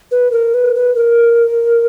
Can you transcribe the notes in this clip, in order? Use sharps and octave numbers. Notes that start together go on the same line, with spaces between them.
B4
A#4
B4
B4
A#4